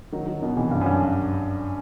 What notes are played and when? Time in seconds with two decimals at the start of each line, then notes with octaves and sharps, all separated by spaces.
0.13 D#3 F#3
0.27 D#3 F#3
0.42 B2 D#3
0.56 C3 E3
0.71 G2
0.81 F#2
0.86 G2